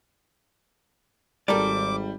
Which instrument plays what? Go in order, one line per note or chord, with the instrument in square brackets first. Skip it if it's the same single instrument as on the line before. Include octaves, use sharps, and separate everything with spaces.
[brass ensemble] G#1 [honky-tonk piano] G3 [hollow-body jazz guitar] A4 A#4 D5 [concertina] D6